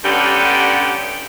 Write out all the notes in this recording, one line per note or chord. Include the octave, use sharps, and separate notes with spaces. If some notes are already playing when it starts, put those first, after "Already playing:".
G2 D3 G3 B3 C#4 G4